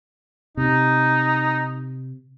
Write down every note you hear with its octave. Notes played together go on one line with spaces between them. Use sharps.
C3 D#4